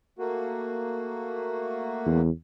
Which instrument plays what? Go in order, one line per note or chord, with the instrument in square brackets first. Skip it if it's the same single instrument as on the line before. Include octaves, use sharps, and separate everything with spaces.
[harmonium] A3 A#3 F#4
[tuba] E2